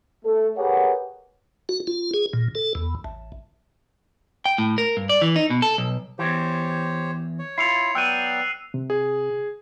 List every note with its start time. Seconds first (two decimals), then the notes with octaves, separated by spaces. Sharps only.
0.25 A3 A4
0.57 G4 G#4 A#4 B4 C#5 F#5
1.69 F#4
1.87 F4
2.14 G#4
2.33 A#2
2.55 A4
2.75 E2
3.04 A1
4.45 G5
4.58 A2
4.78 A#4
4.97 G2
5.09 D5
5.22 E3
5.36 D#4
5.50 B2
5.62 A4
5.78 B1
6.19 E2 E3 G4 C5 C#5
7.39 C#5
7.58 E4 F4 C7 C#7 F7
7.95 F#3 B3 D5 G5 E6 F#6 D#7
8.74 C3
8.90 G#4